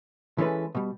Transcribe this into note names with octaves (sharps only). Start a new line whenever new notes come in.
E3 G#3 C#4 A4 B4
B2 G3